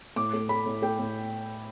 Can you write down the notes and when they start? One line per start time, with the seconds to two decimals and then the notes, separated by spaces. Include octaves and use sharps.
0.16 A2 D6
0.33 A3
0.49 A3 B5
0.66 A2
0.82 A3 G5
0.99 A2